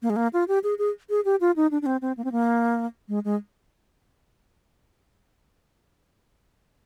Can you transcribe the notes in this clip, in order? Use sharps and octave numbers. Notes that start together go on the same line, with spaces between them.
A#3
G#3
A#3
F4
G4
G#4
G#4
G#4
G4
F4
D#4
D4
D4
C4
C4
A#3
C4
A#3
G#3
G#3